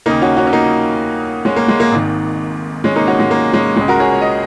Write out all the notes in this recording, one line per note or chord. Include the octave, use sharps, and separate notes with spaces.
D#2 C#3 A#3 D#4
C#4 F#4
C#4 F#4
C#4
A#3 D#4
G#3 C#4
A#3
G#3
A#3
G#1 G#2 D#3
G#3 C#4
A#3 D#4
C#4 F#4
G#3
A#3
G#3 C#4
C#2 C#3 G#3
F#4 A#4
G#4 C#5
C#5
D#5